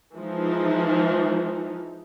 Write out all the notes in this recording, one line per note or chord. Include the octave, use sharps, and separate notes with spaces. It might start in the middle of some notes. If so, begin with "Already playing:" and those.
E3 F3 G#3 D#4